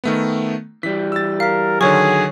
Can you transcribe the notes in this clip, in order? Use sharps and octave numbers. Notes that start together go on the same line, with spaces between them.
D#3 A3 B3
E3 G3 B6
E6 A6
A#4 F5 B6
D3 D#3 F#3 G#4 C#5 C#6